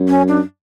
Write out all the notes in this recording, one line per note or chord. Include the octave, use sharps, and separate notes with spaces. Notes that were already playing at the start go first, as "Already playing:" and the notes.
Already playing: F#2
C#4
D4